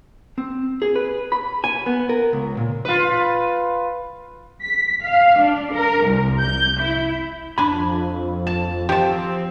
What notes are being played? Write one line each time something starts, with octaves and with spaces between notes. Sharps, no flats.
C4
G#4
B4
B5
G#5
B3
A#4
C#2
A#2
F4 B4
B6
F5
D4
A#4
C2
G6
E4
F2 D4 G#5 B5
A5
F3 C4 G4 A5